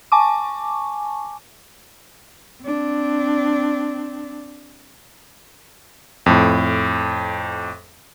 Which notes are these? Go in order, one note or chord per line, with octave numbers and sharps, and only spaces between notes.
G#5 A5 C#6 D6
C4 D4
F2 A2